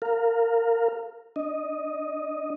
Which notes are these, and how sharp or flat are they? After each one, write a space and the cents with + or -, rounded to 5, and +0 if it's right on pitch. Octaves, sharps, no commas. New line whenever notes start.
A#4 -20 F5 +0
D4 +0 D#5 +0